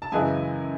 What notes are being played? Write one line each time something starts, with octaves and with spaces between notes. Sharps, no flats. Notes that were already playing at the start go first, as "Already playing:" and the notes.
A5
F#2 C#3 E3 G#3 G#5